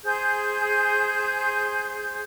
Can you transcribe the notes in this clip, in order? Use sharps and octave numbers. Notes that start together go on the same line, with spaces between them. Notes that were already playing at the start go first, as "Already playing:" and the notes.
G#4 C5 G6